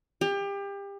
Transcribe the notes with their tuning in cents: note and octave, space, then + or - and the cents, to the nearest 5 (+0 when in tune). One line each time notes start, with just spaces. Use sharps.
G4 +30